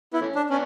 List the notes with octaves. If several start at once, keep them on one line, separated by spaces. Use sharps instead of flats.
B3 E4
E3 A3 C#4
D4
B3 C#4 D4